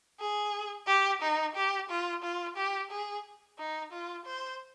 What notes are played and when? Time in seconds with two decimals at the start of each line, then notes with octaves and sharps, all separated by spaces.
0.21 G#4
0.87 G4
1.22 D#4
1.56 G4
1.90 F4
2.23 F4
2.57 G4
2.91 G#4
3.59 D#4
3.92 F4
4.26 C5